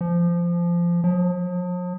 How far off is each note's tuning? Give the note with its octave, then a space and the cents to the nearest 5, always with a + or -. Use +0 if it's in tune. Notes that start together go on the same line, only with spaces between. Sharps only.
F3 -15
F3 +45